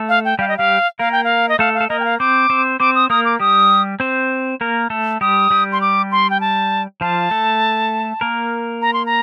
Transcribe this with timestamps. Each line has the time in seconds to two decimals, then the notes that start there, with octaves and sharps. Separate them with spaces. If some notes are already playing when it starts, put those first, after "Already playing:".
Already playing: A3 A4
0.09 F5
0.25 G5
0.39 G3 G4 F5
0.48 D#5
0.57 G3 G4 F5
0.99 A#3 A#4 F5
1.12 G5
1.24 F5
1.49 D#5
1.59 A3 A4 F5
1.74 F5
1.81 A4
1.89 A#3 A#4 D#5
2.00 G5
2.05 F5
2.20 C4 C5 D6
2.50 C4 C5
2.80 C4 C5 D6
2.95 D#6
3.10 A#3 A#4 D#6
3.25 D6
3.40 G3 G4 D#6
4.00 C4 C5
4.61 A#3 A#4
4.90 A3 A4
5.21 G3 G4 D#6
5.50 G3 G4
5.72 C6
5.81 D6
6.12 C6
6.30 G5
6.41 A5
7.01 F3 F4 A5
7.31 A3 A4
8.21 A#3 A#4
8.82 A#5
8.94 C6
9.06 A#5